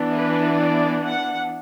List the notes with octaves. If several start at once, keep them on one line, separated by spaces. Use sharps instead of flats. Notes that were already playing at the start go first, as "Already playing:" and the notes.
Already playing: E3 B3 D4
B4
D5
F#5